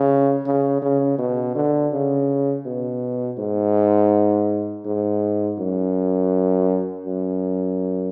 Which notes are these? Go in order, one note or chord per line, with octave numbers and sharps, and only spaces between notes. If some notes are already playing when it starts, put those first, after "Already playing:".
Already playing: C#3
C#3
C#3
B2
D3
C#3
B2
G#2
G#2
F#2
F#2